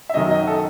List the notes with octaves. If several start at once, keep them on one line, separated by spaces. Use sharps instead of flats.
E5
F#2 D#3 F#3 D#5
D#5
A4